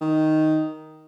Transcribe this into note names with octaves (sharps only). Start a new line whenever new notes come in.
D#3